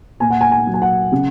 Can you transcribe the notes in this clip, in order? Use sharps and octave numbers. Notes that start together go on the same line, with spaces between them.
A#2 G#5
F#5
G#5
G#5
F#3
G#5
F#5
C#3